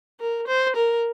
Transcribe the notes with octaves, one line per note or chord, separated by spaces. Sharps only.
A#4
C5
A#4